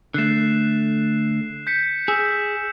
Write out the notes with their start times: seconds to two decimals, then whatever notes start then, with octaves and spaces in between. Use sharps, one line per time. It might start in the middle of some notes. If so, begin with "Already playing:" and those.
0.14 D3 A3 F#6 C7 E7
1.67 G6 B6 C#7
2.08 G#4 E6 E7